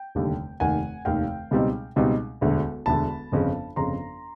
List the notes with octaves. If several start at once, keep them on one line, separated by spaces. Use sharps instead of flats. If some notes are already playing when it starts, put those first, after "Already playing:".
Already playing: G5
F1 D#2 D3 G3
F1 D#2 D#3 F#5 G#5
F1 D#2 D#3 F5 G5
C#2 B2 G3 C4 D#4
C#2 B2 G3 C4 D#4
E1 D2 D3
E1 D2 D3 A5 B5
G1 F2 C#3
G1 F2 C#3 A#5 C6